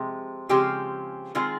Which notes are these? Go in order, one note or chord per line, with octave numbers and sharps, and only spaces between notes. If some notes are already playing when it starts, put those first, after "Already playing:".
Already playing: C3 F3 G#3
C#3 F3 G#3 C4 G4
D#3 G#3 C4 F4 G#4